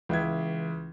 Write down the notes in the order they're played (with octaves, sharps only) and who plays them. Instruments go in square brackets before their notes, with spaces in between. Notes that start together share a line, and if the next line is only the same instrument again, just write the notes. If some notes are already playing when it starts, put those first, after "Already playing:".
[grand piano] C#2 E5 G#6 [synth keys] E3